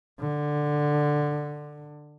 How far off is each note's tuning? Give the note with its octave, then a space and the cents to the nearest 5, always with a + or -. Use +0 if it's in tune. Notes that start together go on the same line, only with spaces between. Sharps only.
D3 +10